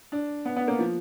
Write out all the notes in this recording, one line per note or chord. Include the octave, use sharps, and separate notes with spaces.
D4
B3
B3
A#3
F3